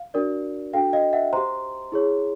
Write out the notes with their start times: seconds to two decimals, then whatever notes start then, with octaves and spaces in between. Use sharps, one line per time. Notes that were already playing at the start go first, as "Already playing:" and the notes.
Already playing: F5
0.14 D4 F#4 A#4 D5
0.73 D4 F#4 A4 F5 G5
0.93 D#5 F5
1.13 E5 F#5
1.33 G4 C5 A#5 C6
1.92 E4 G#4 C#5